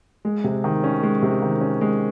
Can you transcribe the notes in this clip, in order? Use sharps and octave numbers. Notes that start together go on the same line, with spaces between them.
G#3
C3
D#3
C#4
G#3
C3
D#3
C#4
G#3